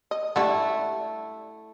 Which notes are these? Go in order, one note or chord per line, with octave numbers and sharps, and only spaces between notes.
D#5
G3 A3 D4 E4 F#4